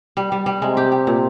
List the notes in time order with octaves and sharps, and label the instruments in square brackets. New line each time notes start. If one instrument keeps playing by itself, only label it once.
[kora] G3
G3
G3
[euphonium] C3 [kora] G#3
[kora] G4
G4
A#2